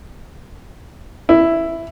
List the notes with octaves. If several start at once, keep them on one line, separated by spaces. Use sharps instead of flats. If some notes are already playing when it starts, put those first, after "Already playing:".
E4